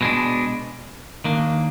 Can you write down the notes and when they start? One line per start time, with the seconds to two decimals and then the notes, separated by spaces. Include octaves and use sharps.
0.01 B2 G#3 D4
1.24 D#2 D#3 A#3 D4